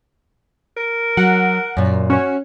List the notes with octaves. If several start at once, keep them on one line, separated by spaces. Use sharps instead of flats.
A#4
F#3 F#5
F#2 A#2
C#4 F#4 C#5